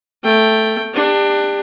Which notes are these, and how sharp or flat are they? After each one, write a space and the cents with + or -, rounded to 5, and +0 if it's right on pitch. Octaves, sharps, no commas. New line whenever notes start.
A3 +0 G5 +0
D4 +20 G4 +35